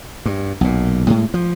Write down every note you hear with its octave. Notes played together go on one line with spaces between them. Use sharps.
G2
B1 A#2
A2 G#3
F3